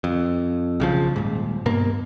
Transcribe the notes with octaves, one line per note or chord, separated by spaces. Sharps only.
F2
B1 C#3 F3
D#1 G#2
G2 B2 A#3